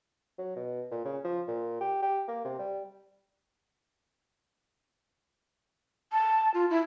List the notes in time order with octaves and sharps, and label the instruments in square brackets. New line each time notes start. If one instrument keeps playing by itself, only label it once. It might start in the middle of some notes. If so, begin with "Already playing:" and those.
[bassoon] F#3
B2
A#2
C#3
F3
A#2
G4
G4
A#3
C3
G3
[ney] A5
F4
E4